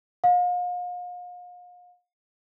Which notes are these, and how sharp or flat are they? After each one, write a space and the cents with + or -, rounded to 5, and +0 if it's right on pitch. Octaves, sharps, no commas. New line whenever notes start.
F5 +40